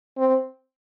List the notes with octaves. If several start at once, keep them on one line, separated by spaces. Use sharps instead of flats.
C4